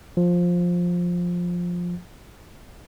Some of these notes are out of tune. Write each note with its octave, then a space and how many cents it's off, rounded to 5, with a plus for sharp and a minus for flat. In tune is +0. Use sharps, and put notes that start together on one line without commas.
F3 +10